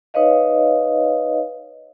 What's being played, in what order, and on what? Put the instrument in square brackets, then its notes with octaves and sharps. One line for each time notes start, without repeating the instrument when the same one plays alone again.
[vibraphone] D#4 B4 C#5 D#5 F5